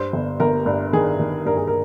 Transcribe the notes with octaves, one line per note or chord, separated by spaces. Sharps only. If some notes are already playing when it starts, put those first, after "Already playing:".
Already playing: G2 C5
G1
G1 A#4
G2
D#3 G#4
D#3
G2 A#4
G#4
A#4